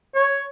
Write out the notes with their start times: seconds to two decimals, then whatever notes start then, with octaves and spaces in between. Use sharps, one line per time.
0.15 C#5